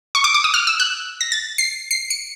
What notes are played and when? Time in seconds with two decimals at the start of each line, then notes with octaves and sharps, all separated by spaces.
0.15 C#6
0.24 D6
0.34 D6
0.44 D#6
0.54 F6
0.67 E6
0.80 F#6
1.21 A#6
1.32 A6
1.58 C7
1.91 C7
2.10 C#7